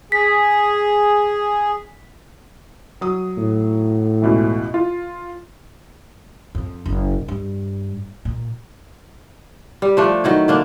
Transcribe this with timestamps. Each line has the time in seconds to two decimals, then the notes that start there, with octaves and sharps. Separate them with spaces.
0.12 G#4 B6
3.01 F#3 D#6
3.38 A2
4.22 C#2 B2 E3
4.74 F4
6.55 F2
6.86 F#1
7.28 G2
8.25 A#2
9.82 G3
9.97 F3 A3 D4
10.24 D#3 F#3 E4
10.48 D3 A#3 D4